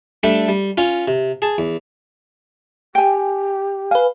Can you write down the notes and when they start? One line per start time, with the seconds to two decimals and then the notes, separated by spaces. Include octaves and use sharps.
0.23 G3 A3 D4 G4
0.48 G3
0.78 C#4 F4
1.08 C3
1.42 G#4 A5
1.58 E2
2.95 G4 G5 G#5
3.91 B4 F5 G#5